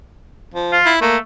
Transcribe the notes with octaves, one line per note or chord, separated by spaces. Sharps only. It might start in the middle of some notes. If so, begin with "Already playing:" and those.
F3
F4
E4
A3 A#3